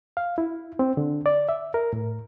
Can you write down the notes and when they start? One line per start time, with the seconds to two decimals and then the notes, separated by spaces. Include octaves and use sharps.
0.17 F5
0.38 E4
0.79 C4
0.97 D3
1.26 D5
1.49 E5
1.74 A#4
1.93 A2